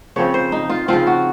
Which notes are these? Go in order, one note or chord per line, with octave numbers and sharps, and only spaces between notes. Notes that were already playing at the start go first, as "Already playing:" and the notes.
C#3 F3 C4 C#5
C5
D#4
F4
C#3 F3 C4 F4
F#4